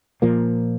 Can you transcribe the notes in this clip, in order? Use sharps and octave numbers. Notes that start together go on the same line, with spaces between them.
A#2 F3 A#3